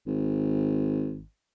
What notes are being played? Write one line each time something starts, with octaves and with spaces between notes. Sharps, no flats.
G#1